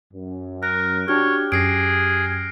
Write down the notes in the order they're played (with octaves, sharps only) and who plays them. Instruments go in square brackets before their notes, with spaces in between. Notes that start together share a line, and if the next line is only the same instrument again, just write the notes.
[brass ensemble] F#2
[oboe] A#4 [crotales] F#6
[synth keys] D4 F#4 [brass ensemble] G4 [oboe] C#5 [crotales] F6
[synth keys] F#2 C#4 [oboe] G#4 [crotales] A#6 C7 D7